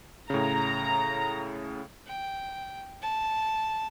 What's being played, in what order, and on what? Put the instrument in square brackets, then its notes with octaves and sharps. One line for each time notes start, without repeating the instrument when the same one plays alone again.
[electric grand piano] A2 C#3 [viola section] A#5
[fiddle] G5
A5